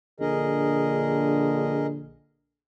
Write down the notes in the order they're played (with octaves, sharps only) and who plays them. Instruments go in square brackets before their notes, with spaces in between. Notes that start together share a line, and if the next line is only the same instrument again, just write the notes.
[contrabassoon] A#1 [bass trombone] D3 [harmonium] G#4 A#4 D#5